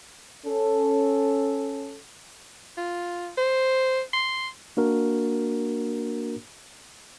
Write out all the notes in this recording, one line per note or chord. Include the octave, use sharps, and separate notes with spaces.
C#4 A4
F4
C5
C6
A#3 D4 F#4 A#4